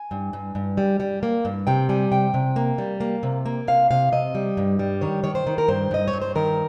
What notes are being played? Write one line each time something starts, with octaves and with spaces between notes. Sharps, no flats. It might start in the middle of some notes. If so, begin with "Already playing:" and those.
Already playing: G#5
G2
G2
G2
G3
G3
A#3
G2
C3 G5
G3 G#5
C3 G5
C3
A#3
G3
A#3
C3
A#3
C3 F5
C3 F5
C3 D#5
G3
G2
G3
D#3 C#5
D#3 C#5
C5
D#3
A#4
G2 C5
G2 D#5
C#5
G2
C5
D#3 A#4